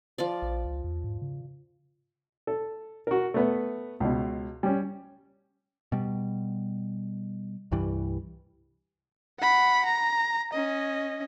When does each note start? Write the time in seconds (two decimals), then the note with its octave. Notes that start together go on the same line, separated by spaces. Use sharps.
0.18 F3 F4 D5
0.42 A#1
0.65 C#2
0.84 E2
1.04 G#2
1.22 C#3
2.47 A4
3.07 F#4 A#4
3.34 A3 B3 B4
4.00 C#2 B2
4.63 G3 C#4
5.92 B2 G3
7.72 C2 G2 E3 G3
9.40 F#5 B5
9.86 A#5
10.53 C#4 D#5